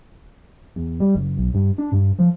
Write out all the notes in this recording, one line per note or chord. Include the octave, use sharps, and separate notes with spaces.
E2
G3
F#1
B1
G2
D4
G2
F3